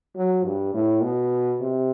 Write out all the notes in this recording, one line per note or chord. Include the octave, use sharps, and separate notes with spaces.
F#3
G2
A2
B2
C3